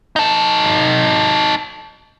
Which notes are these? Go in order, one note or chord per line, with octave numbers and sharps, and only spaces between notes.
D#4 A4